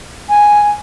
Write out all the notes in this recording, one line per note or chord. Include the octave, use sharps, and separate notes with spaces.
G#5